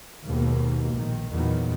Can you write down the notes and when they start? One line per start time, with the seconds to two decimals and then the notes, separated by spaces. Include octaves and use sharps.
0.24 D#2 G#2 B2 D#3 A#3
0.95 A#1 D#3
1.30 E2 A#2 D#3 F#3 B3